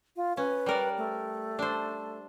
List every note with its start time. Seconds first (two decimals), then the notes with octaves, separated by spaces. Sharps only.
0.16 F4
0.37 C#4 B4
0.66 G3 A#4 D5
0.97 A3
1.59 D4 C5